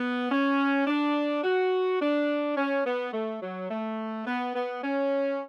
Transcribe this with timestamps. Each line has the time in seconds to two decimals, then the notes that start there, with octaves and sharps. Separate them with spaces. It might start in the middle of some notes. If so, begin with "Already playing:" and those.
Already playing: B3
0.31 C#4
0.87 D4
1.44 F#4
2.01 D4
2.57 C#4
2.86 B3
3.13 A3
3.42 F#3
3.70 A3
4.27 B3
4.55 B3
4.83 C#4